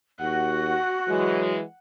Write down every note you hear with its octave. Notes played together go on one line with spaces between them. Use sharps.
D#2 F#4 F#5
E3 F#3 G#3